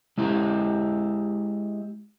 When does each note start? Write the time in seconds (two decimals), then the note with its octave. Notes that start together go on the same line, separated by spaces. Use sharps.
0.18 G#3 E4 G4